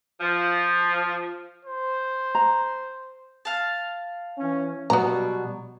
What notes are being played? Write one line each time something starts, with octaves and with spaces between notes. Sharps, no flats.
F3
C5
A#5
F5 A5
E3 C#4
B2 F#3 G3 B3 A#5